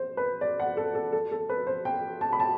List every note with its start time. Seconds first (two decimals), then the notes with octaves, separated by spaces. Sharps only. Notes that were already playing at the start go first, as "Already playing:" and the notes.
Already playing: C5
0.17 B4
0.41 D5
0.60 F#5
0.77 A4
0.95 A4
1.13 A4
1.32 A4
1.49 B4
1.67 C5
1.85 G5
2.21 A5
2.33 B5
2.40 A5